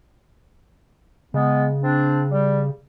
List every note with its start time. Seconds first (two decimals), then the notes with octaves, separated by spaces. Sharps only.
1.34 C#3 G#3 B3
1.82 C4 D4
2.30 G3